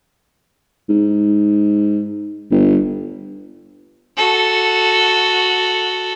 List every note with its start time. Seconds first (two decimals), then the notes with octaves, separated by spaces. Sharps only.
0.89 G#2
2.51 G1
4.17 F#4 A4